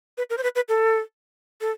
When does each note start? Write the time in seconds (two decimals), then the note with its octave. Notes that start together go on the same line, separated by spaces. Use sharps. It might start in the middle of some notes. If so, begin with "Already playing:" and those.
0.18 B4
0.30 A#4
0.38 C5
0.43 B4
0.56 B4
0.69 A4
1.61 A4